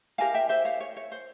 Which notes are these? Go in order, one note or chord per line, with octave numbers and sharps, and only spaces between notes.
E4 G4 A#4 F5 G#5
E5 G5
C5 E5
C#5 F5
C#5
C#5
C5